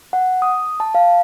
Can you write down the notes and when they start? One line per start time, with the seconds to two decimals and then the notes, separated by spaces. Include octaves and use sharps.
0.13 F#5
0.42 D#6
0.80 A5
0.95 F5